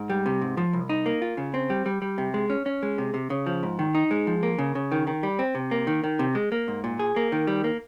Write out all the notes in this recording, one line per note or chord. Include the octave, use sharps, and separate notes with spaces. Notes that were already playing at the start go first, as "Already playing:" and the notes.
Already playing: G#2
G3
C3
G#2
F3
C2
D#4
A#3
F4
C#3
C4
G3
G3
G3
C3
G#3
C#4
C#4
G#3
C3
C3
C#3
F3
G#2
D#3
D#4
G#3
F3
A#3
C#3
C#3
D#3
D#3
G3
C4
C3
A#3
D#3
D#3
C3
G#3
A#3
G#2
A#2
G#4
A#3
D#3
G3
A#3